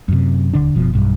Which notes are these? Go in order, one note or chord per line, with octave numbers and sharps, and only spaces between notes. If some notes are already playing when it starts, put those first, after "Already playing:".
F#2 C3
D#1 D3 D4
F#1 B2 F3
B1 G2